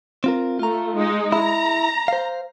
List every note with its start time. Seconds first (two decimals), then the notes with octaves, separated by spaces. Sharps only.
0.24 C4 F4 A#4
0.59 A3 F4 A#5
0.97 G#3 D#4
1.32 E4 A#5
2.08 C5 F5